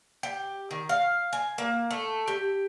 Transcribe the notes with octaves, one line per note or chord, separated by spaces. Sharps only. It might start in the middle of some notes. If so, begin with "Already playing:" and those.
G4
D#3
F5
G#5
A#3
A3
G4